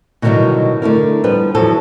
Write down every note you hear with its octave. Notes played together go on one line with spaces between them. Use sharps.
B2 D3 D#3 F#3 G3 E4
D3 A3 E4 A#4
F3 G3 B3 B4
E2 F3 F#3 A4